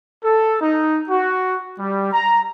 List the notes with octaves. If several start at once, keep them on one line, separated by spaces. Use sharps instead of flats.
A4
D#4
F#4
G3
A#5